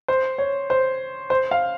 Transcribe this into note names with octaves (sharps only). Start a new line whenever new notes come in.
C5
C#5
C5
C5
F5